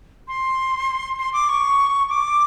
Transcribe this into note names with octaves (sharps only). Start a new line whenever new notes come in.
C6
C6
D6
C#6
D6